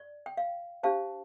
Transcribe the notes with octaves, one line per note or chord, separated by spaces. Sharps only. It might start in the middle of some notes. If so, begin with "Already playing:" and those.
Already playing: D5
G5
F5
D4 G4 C5 F5 A5